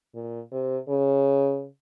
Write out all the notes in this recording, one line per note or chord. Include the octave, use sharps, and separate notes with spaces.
A#2
C3
C#3